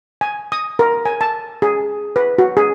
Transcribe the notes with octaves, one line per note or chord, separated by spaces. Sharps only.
G#5
D#6
A#4
G#5
A5
G#4
B4
F#4
G#4